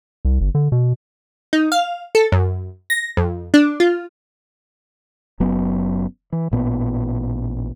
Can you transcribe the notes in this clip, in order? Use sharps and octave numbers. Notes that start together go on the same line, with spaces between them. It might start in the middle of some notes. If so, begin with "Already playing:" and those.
C2
G1
D3
B2
D#4
F5
A4
F#2
A#6
F2
D4
F4
F#1 F#3 B3 C#4
E3
A1 A#2 B3